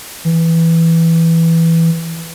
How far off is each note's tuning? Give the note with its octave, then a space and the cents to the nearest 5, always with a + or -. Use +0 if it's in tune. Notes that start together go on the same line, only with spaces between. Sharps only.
E3 +0